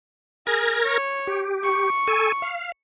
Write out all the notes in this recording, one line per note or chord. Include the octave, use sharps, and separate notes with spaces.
G#4 A#4 G#6 A#6
C#5
G4
C#6
A4 G#5
F5